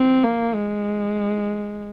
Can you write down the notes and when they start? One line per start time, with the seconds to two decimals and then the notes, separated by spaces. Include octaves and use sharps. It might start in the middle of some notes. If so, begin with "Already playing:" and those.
Already playing: C4
0.24 A#3
0.54 G#3